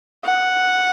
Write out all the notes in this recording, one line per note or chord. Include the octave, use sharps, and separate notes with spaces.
F#5